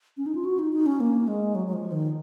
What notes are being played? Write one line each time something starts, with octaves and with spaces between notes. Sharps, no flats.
C#4
D#4
F4
F#4
D#4
D#4
C#4
A#3
G#3
F#3
F#3
F3
D#3